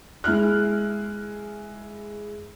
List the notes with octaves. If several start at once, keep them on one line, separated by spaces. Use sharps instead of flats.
G#3 E4 F6 F#6